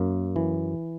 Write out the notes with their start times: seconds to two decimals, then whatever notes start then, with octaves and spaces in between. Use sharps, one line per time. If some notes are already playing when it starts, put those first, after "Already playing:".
Already playing: F#2 A#3
0.36 E3